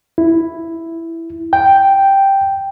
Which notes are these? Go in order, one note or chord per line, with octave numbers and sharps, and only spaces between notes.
E4
G5